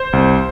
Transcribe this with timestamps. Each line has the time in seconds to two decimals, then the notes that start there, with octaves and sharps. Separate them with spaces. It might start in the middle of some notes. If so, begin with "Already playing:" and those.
Already playing: C5
0.13 C2